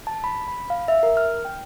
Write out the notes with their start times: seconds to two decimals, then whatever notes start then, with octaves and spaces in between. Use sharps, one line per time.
0.07 A5
0.24 B5
0.48 B5
0.70 F5
0.88 E5
1.03 A#4
1.17 F6
1.45 G5